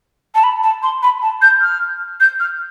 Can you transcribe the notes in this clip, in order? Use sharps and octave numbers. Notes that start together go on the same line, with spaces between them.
A5
B5
A5
C6
B5
A5
G6
F6
G6
F6